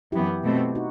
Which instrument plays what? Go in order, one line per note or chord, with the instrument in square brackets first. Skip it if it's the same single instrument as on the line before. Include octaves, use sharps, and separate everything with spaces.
[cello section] F#2 E3 B3 [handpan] E4 G4
[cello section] B2 A3 C4
[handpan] D#4 F#4